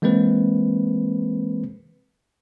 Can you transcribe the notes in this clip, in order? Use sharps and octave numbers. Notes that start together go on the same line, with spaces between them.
E3 G#3 A#3 C4 B4